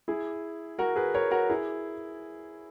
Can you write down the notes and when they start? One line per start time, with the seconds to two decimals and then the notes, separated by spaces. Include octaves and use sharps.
0.08 E4 G#4
0.79 F#4 A#4
0.96 G#4 B4
1.14 A#4 C#5
1.31 F#4 A#4
1.49 E4 G#4